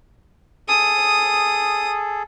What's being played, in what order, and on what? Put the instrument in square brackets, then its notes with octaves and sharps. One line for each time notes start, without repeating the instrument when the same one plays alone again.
[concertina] G#4 A4 [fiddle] D#6